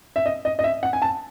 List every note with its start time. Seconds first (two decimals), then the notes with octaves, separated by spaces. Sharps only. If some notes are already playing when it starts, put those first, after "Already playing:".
0.16 E5
0.26 D#5
0.45 D#5
0.59 D#5
0.64 E5
0.83 F#5
0.93 G#5
1.02 A5